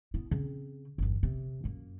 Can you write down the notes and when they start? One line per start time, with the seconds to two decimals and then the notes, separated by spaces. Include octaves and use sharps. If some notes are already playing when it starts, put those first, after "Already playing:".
0.14 B3 E4
0.31 C#3 C4
0.98 G1 E2
1.23 C3
1.64 F#2 A#3